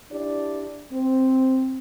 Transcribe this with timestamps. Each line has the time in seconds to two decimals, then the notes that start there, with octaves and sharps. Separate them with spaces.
0.12 D4 E4 G4 D5
0.92 C4